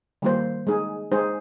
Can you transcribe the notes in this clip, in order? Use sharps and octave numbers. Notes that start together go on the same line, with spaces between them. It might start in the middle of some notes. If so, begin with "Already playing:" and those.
D#3 G3 A#3 F4 C5
G#3 D#4 G#4
G#3 D#4 G#4 C5